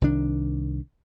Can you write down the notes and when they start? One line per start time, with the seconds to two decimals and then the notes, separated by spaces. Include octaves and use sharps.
0.01 C2 D#3 D4